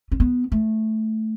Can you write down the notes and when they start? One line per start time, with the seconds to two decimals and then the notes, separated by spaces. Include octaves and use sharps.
0.12 C#4
0.20 B3
0.52 A3